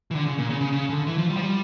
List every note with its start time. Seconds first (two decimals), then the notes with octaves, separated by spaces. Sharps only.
0.11 E3
0.15 D3
0.26 C#3
0.38 A#2
0.50 C#3
0.61 C#3
0.72 C#3
0.90 D3
1.07 E3
1.18 F3
1.30 G3
1.37 F3
1.42 G3